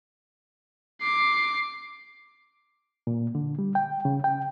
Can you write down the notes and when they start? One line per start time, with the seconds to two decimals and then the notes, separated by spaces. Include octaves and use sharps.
1.02 D6 C7
3.07 A#2
3.35 D3
3.59 G3
3.75 G5
4.05 C#3
4.24 G5